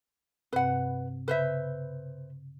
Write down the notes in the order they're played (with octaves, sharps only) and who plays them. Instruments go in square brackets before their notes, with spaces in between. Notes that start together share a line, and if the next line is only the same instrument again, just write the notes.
[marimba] G2 C3 C4 [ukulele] B4 F#5
[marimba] C#3 [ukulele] B4 C5 E5